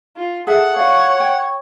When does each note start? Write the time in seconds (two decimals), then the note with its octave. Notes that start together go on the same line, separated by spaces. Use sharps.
0.16 F4
0.47 G#4 A4 E5 F#5
0.76 F#4 C#5 D5 F5
1.20 G5